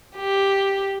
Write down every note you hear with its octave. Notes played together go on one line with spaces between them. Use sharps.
G4